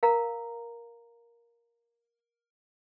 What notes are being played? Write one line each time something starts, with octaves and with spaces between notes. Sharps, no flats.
A#4 F5 A#5